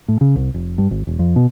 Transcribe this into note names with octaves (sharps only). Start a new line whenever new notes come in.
A2
C#3
C2
F1
G2
G#1
E1
F2
B2